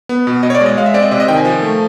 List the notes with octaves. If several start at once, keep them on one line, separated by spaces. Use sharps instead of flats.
B3
B2
B2 D#5
C#5
D5
G#3
D#5
G#3 F5
E5
C4 D5
D#5
C3 D5
D#5
D#3 G5
G#5
F3
A3